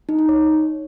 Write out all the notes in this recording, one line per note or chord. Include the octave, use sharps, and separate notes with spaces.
D#4
D#4
C#5